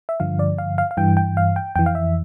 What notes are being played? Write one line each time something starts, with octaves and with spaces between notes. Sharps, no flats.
E5
G2 D3 F3 F5
D5
F5
F5
F5
G2 E3 G5
G5
F5
G5
F2 E3 G5
F5
E5